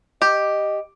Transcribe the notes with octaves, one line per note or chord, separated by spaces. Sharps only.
G4 D#5